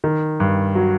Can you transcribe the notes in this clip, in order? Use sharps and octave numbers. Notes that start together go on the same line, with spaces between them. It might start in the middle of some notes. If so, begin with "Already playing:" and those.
D#3
G2
F#3